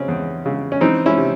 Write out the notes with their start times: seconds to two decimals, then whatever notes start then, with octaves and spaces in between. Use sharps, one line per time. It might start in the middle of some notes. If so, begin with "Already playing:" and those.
Already playing: C#3 C4 C#4
0.08 E2
0.46 C#3
0.72 C#4
0.81 E3 C4 D#4
1.06 C#4 E4
1.18 C3